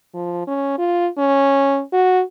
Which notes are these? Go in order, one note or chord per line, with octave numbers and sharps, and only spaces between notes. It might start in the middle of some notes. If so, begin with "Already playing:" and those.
F3
C#4
F4
C#4
F#4